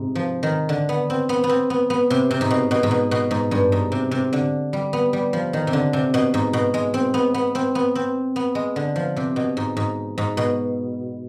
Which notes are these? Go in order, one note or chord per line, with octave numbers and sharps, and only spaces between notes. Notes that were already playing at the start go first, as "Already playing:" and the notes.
Already playing: G#2 C3
F3
D#3
D3
B3
C4
B3
B3
C4
B3
B3
C3
C3
G#2
B2
B2
G#2
B2
B2
G#2
G2
G#2
C3
C3
D3
G3
B3
G3
F3
D#3
C3
D3
C3
B2
G#2
B2
G#3
C4
B3
B3
C4
B3
C4
B3
G#3
D3
F3
C3
B2
G#2
G#2
G#2
B2